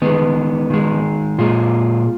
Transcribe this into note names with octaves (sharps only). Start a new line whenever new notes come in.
D#3 G#3 B3
D#3 G#3
A#2 G#3 F4